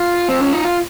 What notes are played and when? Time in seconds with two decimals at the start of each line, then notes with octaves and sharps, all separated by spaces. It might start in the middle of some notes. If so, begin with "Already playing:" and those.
Already playing: F4
0.29 C4
0.41 C#4
0.53 D#4
0.64 F4